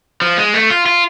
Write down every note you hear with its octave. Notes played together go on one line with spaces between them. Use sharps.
F3
G#3
A3
F4
F4